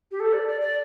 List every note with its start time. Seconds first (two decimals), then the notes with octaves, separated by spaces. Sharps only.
0.11 G4
0.20 A4
0.33 D5
0.47 D5
0.61 D5